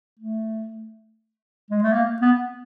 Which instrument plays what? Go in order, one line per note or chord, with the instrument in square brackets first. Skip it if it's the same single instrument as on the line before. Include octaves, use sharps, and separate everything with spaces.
[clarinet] A3
G#3
A3
A#3
B3